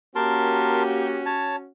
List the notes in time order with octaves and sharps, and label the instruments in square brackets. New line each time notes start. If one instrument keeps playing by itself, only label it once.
[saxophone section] A#3 G4 [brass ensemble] C#4 F#4 [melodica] A#4 A5 C6
[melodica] C#5 A5